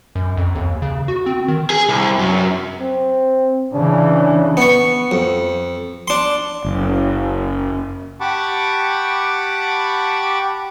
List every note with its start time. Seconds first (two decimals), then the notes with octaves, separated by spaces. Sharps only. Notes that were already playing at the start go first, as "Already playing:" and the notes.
0.15 F#2
0.37 F2
0.55 D#2
0.82 C#3
1.08 F#4
1.26 C4
1.48 D#3
1.70 G#4
1.88 C2
2.19 F#2
2.80 C4
3.73 C#3 E3 D4
4.57 B3 C#6
5.11 F2
6.08 D4 C6
6.65 F#1
8.21 G4 F#5 A5 B5 C#6 D6